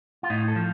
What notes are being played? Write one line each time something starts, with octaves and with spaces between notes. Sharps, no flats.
F4
A2 D#4
A4
F3